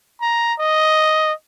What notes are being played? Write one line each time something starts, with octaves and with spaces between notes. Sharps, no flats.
A#5
D#5